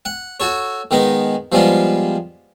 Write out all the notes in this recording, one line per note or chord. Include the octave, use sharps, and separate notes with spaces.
F#5
F#4 A4 C#5
D#3 G#3 B3 D#4
F3 G3 G#3 B3 F4